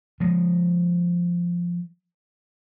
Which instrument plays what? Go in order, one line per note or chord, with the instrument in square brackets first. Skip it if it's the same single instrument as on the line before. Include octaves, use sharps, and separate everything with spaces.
[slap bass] F3 G#3